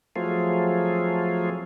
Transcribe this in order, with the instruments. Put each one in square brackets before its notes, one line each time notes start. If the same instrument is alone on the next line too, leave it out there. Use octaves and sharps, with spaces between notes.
[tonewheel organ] F3 F#3 A3 C4 F4 G#4